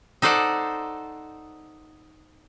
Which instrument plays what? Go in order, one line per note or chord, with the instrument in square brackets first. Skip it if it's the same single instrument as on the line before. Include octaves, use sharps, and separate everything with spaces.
[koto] D#4 A4 C5 D5 F#5